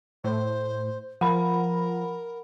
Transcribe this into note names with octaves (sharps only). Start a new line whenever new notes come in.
A2 C5
F3 A#4 F#5 B5